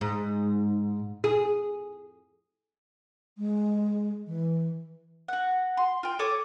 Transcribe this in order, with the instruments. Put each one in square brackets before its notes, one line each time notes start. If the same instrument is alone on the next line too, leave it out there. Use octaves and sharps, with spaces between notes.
[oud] G#2
G#4
[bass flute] G#3
E3
[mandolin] F#4 F#5
C6
F4 G5
A4 C#5 D6 D#6